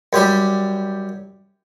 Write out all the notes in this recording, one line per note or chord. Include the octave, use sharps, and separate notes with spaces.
F#2 G3 G4